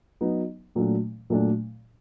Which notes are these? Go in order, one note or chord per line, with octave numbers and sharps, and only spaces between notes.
F#3 B3 D#4
A#2 F#3 A3 D4
A#2 F#3 A3 D4